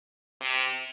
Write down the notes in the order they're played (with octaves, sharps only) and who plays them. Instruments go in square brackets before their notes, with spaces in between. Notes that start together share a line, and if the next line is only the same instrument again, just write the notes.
[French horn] C3